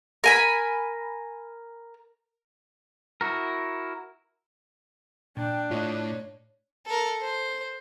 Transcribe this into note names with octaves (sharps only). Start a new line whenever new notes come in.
A#4 G#5 B5
E4 F#4 A#4
A#2 D4 G5
A2 F4 C#5 D#5
A4 A#4
C5